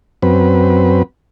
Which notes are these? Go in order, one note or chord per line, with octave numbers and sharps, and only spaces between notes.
F#2 C4 B4